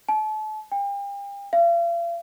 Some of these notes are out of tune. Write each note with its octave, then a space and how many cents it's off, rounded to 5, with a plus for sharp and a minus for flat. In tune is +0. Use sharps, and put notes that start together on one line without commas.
A5 -35
G5 +40
F5 -40